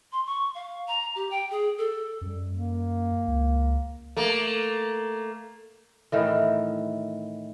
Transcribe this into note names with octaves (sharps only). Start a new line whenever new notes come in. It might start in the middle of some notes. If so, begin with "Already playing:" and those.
C6
C#6
F5
A#5
G4
G5
G#4
A4
F#2 G3
A#3
C#2
A3 A#3
A2 D#3 E3